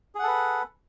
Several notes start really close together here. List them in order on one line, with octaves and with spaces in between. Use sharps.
G#4 F#5 A4 B4